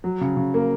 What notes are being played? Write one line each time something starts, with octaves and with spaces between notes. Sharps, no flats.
F#3
C#3
C#3
A#3